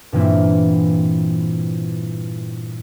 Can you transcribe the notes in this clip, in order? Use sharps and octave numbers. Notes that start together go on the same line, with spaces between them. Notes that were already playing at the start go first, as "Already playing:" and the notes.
G2 A#2 E3 A#3 C4 E4